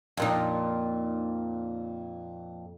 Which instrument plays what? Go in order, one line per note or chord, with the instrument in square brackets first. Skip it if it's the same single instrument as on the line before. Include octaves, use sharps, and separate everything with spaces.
[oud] F2 A#2 D#4